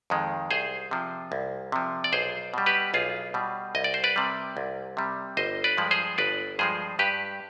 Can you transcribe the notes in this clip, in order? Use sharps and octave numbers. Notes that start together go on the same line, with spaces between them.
F2 D#3 G#3
C2 G#4 C5
C3 F3
C2
C3 F3
D5
B1 G#4 C5
B2 G3
G4 B4
B1 F4 G#4
B2 G3
C2 D#5
D5
C5
B4 D5
C3 G3
C2
C3 G3
G1 C5 D#5
B4 D5
G2 F3 G#3
G#4 C5
G1 B4 D5
G2 F3 G#3 G#4 C5
G2 G4 B4